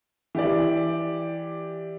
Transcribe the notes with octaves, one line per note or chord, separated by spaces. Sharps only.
E3 G4 D5